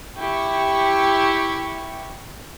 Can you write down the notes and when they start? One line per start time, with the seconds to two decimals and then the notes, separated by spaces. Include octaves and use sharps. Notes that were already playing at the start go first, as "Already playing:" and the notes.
0.19 E4 G4 C#6